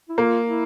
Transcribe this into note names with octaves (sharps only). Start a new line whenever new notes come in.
E4
A#3 F4
E4